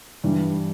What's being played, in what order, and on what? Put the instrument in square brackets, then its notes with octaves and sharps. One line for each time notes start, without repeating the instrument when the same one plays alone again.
[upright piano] G2 E3 G3